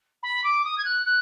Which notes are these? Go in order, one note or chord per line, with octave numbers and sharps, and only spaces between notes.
B5
D6
D#6
G#6
F#6
F#6